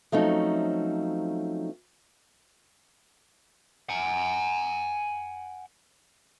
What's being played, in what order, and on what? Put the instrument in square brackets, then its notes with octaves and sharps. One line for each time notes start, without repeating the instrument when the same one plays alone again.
[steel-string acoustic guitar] F3 F#3 A3 C4 C#4 D#4
[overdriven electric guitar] F#5 G#5